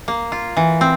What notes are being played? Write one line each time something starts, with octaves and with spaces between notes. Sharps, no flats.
A#3
F4
E3
C4